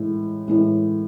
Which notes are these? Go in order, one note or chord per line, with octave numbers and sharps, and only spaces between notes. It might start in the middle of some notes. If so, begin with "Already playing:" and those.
Already playing: A2 E3 G#3
A2 E3 G#3